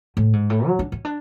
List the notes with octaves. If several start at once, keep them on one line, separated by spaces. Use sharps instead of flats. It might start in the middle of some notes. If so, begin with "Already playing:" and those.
A2
G#2
A2
F#3
D4
C#4
D4